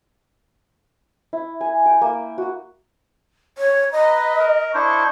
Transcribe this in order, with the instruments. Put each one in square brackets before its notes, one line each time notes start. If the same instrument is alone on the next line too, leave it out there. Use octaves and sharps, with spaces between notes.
[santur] E4
G#5
G5
A#3
F#4
[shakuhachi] C#5
[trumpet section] B4 A#5 [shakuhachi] D#5
[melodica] A#4
[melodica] D4 E4 C5 [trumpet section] D#5 C#6